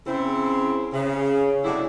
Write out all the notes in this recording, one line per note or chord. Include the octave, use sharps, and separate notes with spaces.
C#3 C4 E4
C#3
A2 C3 F#3 D4 E4 G#4